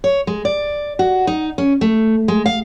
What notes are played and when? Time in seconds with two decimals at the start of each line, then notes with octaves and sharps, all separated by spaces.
0.04 C#5
0.27 G#3
0.45 D5
0.99 F#4
1.27 D#4
1.58 C#4
1.81 A3
2.28 G#3
2.46 F5